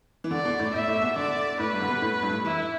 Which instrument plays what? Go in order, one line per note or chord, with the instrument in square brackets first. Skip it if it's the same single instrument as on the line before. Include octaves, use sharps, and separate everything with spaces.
[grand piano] E3
[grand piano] D3 [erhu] D5
[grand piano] B2
A2
[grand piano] A2 [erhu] E5
[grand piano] A2
B2
[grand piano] D3 [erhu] D5
[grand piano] A2 [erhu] B4
[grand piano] G2
D3
B2
A2
G2
A2
[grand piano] E3 [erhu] E4